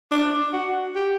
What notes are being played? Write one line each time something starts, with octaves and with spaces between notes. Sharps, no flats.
D4
F#4
G4